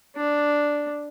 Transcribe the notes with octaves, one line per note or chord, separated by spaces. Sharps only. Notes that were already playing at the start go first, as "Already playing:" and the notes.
D4